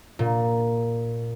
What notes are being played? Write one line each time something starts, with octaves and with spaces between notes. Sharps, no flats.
A#2